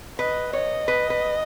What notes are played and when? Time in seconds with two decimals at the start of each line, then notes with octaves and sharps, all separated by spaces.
0.19 B4 D#5
0.53 C#5 D#5
0.88 B4
1.10 B4